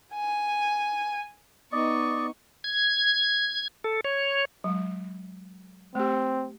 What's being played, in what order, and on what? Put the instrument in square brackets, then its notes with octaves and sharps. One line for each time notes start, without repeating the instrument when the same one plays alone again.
[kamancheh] G#5
[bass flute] B3 [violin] D#4 C#6 [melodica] D5 D#5
[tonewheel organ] G#6
A4
C#5
[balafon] F#3 G#3
[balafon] A3 G4 [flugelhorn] C4